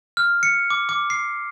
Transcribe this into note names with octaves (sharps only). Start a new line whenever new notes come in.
F6
C#7
D6
D6
C7